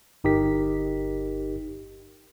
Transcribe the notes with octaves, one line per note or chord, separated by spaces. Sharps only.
G1 D#4 G4 A#4 B6